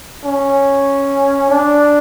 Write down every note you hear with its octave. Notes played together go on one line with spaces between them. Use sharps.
C#4
D4